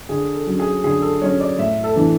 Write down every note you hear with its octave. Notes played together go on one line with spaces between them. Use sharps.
D3 G#4
A4
F#3 C#4
G#4
D3 G#4
A4
F#3 C#4 C#5
D5
A2 E5
A4
E3 B3 D4